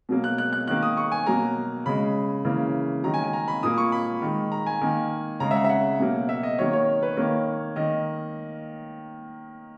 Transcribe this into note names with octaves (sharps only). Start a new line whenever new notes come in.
B2 F#3 A#3
F#6
F#6
F#6
D#3 A#3 F#6
D#6
C#6
G#5
B2 F#3 A#3 A#5
C#3 G#3 B5
C#3 E3 A#3
D#3 F#3 A#3 A#5
G#5
G#5
A#5
B5
A#2 A#3 D#6
C#6
B5
D#3 G#3
A#5
G#5
D#3 A#3
C#3 G#3 A#5
E5
F#5
E5
F#5
B2 F#3 A#3
E5
D#5
D#3 F#3 A#3 C#5
C#5
B4
D#3 A#3 C#5
D#3 A#3 D#5